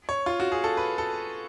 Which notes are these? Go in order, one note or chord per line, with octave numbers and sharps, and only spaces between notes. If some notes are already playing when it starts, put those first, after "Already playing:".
C#5
F4
F#4
G#4
A4
B4
A4